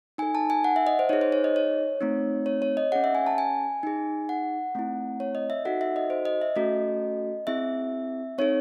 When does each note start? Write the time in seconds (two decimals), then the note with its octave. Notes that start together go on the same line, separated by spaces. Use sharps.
0.18 D#4 A4 G#5
0.35 A5
0.50 G#5
0.64 F#5
0.76 E5
0.87 D#5
0.99 C5
1.09 D#4 G#4 C#5
1.21 C5
1.32 C#5
1.44 D#5
1.56 C#5
2.01 A3 C4 D#4
2.46 C#5
2.62 C#5
2.77 D#5
2.92 C#4 G#4 F#5
3.04 E5
3.15 G#5
3.27 A5
3.38 G#5
3.83 D#4 G#4
4.29 F#5
4.75 A3 C4 E4
5.20 C#5
5.35 D#5
5.50 E5
5.65 D#4 F#4 A4 F#5
5.81 E5
5.96 D#5
6.10 C5
6.25 D#5
6.42 E5
6.56 A3 C#4 F#4 A4 D#5
7.47 C4 E4 G#4 E5
8.38 C4 D#4 A4 C#5